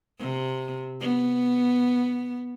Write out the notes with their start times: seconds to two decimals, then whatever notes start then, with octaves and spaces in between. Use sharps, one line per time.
0.19 C3
1.00 B3